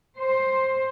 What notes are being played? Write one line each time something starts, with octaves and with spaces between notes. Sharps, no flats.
C5